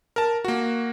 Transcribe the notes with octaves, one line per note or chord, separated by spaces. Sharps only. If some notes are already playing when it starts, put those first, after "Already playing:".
A#4 A5
A#3 F#4